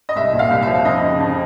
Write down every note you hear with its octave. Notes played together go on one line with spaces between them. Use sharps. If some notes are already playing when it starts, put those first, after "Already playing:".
D#5
C2 E5
A#2
F5
C2
F3 E5
F2 D#5
C#3
F2